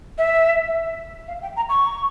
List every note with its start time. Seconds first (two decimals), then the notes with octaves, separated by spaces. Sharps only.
0.18 E5
1.28 F5
1.42 G5
1.56 A#5
1.69 C#6